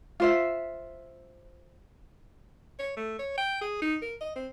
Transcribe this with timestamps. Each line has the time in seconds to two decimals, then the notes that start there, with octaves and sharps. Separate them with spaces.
0.20 F4 C5 E5
2.79 C#5
2.97 A3
3.19 C#5
3.38 G5
3.61 G#4
3.82 D#4
4.02 A#4
4.21 D#5
4.36 C4